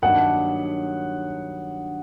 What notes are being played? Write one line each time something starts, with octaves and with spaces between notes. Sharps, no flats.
G2 D#3 F#3 A#3 D4 F#5